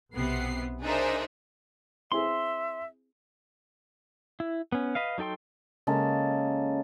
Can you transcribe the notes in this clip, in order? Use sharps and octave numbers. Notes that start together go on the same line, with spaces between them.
B1 C3 B3 C7
D4 D#4 G#4 A#4 C5 E5
C4 E4 G#4 E5 C6
E4
B3 C#4
B4 D#5 F5
F#3 D#4 A4 G5 C6
C#3 G#3 A#3 A4